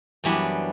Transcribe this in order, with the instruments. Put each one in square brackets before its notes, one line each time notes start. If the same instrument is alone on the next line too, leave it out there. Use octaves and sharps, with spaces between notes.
[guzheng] F#2 E3 G3 B3 D4